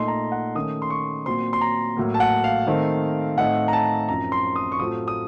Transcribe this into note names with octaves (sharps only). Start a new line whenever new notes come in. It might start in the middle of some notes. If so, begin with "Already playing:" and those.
Already playing: A#2 A3 D#4 C6
A#5
F#5
D#3 A3 C#4 D#6
C6
C#6
A#2 F#3 C4 C6
C6
A#5
A2 F#3 A#3
A5
F#5
F5
D#3 A3 C4 D#4
A2 A3 C4 D#4 F#5
A#5
A5
F#2 F3 C4 A#5
C6
D#6
C#6
A2 F#3 A3 C4 F4 D#6
D#6